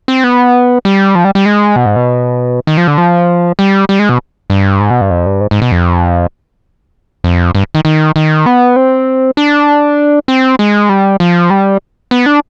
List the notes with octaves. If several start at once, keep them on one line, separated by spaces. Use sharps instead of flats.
C4
B3
G3
F3
G3
G3
G#3
B2
G#2
B2
D#3
F3
D3
F3
G3
G3
G#3
B2
G2
G#2
B2
G2
F2
G2
G#2
G#2
B2
F2
F2
G2
D#3
D#3
D#3
B3
C4
D4
C4
G#3
G3
F3
G3
B3
D4